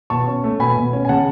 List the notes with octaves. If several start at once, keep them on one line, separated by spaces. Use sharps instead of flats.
B2 A5 C#6
C#4
A3
B2 G#5 B5
B2
C#4
G#5
C#3 F#5 A5